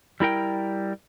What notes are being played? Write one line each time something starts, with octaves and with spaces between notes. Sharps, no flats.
G3 E4 A#4 G5